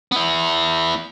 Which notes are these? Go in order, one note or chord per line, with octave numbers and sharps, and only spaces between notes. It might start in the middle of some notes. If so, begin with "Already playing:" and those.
B3 E4